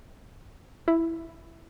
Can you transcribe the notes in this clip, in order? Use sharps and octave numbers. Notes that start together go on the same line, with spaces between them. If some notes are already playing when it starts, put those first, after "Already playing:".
E4